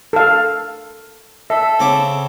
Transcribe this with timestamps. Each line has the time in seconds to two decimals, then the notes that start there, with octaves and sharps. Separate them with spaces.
0.13 A4 F5
1.50 A4 E5
1.80 C#3 C4 D6